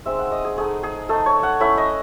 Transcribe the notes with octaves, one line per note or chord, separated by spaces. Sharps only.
G#3 C4 D#4 E5
F#5
D#5
G#4
A3 D#4 G#4
G#4
A3 D#4 A4
C#5
F#5
A3 C#4 E4 E5
D#5